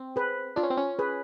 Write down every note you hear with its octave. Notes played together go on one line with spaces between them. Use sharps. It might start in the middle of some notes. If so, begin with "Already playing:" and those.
Already playing: C4
G#4 B4
D4 F4
C#4
C4
C#4
G#4 B4